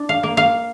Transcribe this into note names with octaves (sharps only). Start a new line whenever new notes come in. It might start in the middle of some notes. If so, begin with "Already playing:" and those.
Already playing: D4
F5
A#3
F5